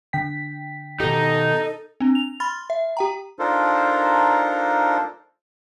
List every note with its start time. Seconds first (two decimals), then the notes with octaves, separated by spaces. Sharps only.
0.13 D3 G5 B6
1.00 B2 D#3 D#4 G4 A4
2.00 C4 D4
2.15 F7
2.40 B5 C6 F6 A6
2.70 E5
2.97 G4 G5 A#5
3.39 D4 D#4 F4 A4 A#4 C5